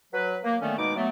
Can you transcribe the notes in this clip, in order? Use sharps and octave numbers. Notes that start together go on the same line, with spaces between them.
F#3 B4
A#3
D3 D#3 A3 B3 C#4
B2 G#3 D#4 D6
F#3 A3 B3